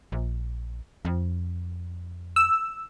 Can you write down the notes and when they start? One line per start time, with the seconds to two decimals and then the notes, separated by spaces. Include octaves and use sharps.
0.12 A#1
1.05 F2
2.36 E6